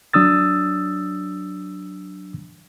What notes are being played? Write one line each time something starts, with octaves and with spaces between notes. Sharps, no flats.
F#3 D4 D#6 E6 A6